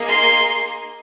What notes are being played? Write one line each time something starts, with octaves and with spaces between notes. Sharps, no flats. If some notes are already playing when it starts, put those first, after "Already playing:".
Already playing: A#3 D#4 G#4
C6